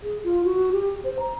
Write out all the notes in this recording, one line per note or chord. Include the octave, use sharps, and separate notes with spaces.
G#4
F4
F#4
G4
C5
A#5